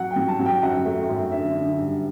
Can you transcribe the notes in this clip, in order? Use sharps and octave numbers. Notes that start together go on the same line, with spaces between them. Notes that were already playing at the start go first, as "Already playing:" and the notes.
Already playing: F#3 F#5
G5
F#3
A5
F#3
G5
F#2 F#5
A3
F#2
D3 E5
D3
G2